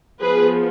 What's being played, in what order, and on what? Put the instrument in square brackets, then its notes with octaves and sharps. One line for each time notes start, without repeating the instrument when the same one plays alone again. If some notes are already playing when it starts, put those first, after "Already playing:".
[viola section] F3 B3 G#4 B4